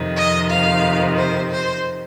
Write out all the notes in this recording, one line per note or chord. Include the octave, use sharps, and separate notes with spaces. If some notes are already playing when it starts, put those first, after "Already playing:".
Already playing: F2 C3 D#3
D#5
F5
C5
C5